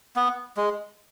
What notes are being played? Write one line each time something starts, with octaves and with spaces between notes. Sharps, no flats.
B3
G#3